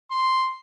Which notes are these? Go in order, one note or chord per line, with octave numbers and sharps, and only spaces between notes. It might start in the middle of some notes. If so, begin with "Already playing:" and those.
C6